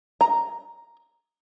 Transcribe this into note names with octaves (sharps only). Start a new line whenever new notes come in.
A#5